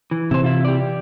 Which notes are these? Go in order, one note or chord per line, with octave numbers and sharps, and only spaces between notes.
E3
C3 E3 E4 C5
E4 F4
G4 D5